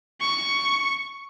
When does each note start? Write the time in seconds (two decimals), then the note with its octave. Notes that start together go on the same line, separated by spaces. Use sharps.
0.21 C#6